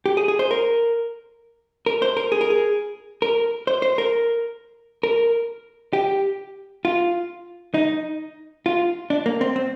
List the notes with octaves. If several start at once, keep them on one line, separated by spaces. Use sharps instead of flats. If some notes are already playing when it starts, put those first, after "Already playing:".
G4
G#4
G#4
C5
A#4
A#4
C5
A#4
G#4
A#4
G#4
A#4
C5
C5
A#4
A#4
G4
F4
D#4
F4
D4
A#3
C4
C4